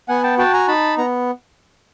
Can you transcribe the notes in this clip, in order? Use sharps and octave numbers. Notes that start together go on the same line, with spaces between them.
B3 F#5 G#5
G5 A5
F#4 G5 A5
G#5 A#5
D#4 A5 B5
B3 A#5